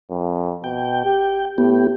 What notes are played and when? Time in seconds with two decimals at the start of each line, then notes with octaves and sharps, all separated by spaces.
0.11 F2
0.64 B2 G5
1.05 G4
1.58 A2 B3 G4